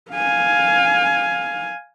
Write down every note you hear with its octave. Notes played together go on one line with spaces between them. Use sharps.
F5 G#5